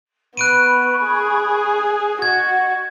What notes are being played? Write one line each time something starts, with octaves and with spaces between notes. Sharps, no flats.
B3 B5 C#6 F#6 D7 D#7
G#4
F#4 D#5 F#5 G#6